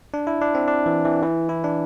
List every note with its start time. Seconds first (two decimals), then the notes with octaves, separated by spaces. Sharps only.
0.14 D4
0.27 E4
0.41 D4
0.55 C4
0.68 D4
0.86 E3
1.05 E3
1.22 E3
1.49 E4
1.64 D4